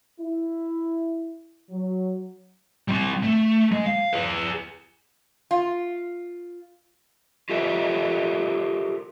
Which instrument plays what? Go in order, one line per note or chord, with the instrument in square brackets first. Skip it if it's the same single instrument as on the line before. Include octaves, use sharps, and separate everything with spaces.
[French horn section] E4
F#3
[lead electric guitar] G3 C4
A3
G#3
F5
G#4 B4
[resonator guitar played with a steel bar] F4
[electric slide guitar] F4 G4 A4 A#4 C5 E5